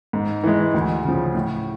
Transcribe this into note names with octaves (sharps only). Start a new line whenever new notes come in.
G#2
E3 G#3
D2
C#3 F3
A2